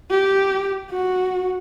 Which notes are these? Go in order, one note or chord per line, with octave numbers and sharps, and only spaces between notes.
G4
F#4